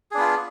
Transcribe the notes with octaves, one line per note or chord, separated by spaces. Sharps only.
B3 D4 F4 G#4